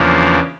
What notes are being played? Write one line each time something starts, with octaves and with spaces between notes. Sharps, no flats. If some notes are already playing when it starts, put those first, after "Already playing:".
Already playing: E2 C#3 F3 A#3 D4